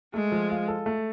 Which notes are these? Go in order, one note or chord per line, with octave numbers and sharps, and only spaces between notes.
G#3 A3
F3
F4
A4
A3